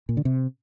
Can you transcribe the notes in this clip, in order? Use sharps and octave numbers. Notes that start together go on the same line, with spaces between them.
A#2
D3
C3